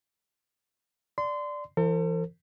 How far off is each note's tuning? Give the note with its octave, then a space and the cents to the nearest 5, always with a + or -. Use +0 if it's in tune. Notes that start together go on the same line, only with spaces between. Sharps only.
D5 +0 C6 -25
E3 +30 A4 +45 C5 +0